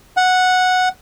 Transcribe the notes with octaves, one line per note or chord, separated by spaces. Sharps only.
F#5